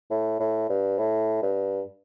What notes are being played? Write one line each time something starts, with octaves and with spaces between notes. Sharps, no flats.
A2
A2
G2
A2
G2